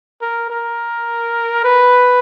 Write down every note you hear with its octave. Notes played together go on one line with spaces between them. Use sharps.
A#4
A#4
B4